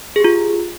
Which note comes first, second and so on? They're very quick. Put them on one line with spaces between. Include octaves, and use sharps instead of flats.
G#4 G4 F4